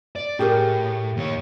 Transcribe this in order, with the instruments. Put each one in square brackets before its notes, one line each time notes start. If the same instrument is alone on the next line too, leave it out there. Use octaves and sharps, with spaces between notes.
[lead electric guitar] D5
[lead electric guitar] A2 [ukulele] G4 G#4 A#4
[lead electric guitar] D#2 C#5